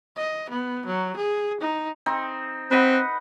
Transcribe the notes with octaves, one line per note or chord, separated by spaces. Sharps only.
D#5
B3
F#3
G#4
D#4
C4 D#4
C4 B4 D#5 F#5